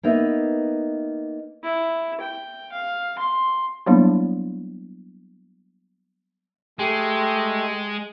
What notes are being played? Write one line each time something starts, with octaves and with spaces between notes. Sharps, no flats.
A#3 B3 D#4 E5
E4
G5
F5
C6
F#3 G3 A#3 B3 D4 E4
G#3 A3 G4